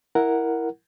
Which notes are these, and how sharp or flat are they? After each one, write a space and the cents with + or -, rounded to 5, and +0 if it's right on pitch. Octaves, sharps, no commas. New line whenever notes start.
E4 +0 A#4 +0 F#5 +0